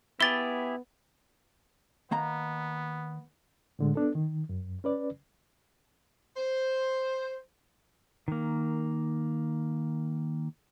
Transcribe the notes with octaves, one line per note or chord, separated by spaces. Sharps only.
B3 E4 G4 G#4 A6 G7
D#3 A#3 B3 A#5
A2 D3 G#3
B3 D4 A4
D#3
F#2
C#4 B4 D5
C5
D#3 A#3